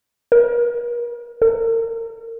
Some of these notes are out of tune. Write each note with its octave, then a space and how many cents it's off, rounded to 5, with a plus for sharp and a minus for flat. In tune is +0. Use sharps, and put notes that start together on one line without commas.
A#4 +45
A#4 -30